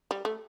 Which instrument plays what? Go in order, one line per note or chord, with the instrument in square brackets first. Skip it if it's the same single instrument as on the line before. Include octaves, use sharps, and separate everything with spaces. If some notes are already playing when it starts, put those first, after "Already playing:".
[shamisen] G3
A3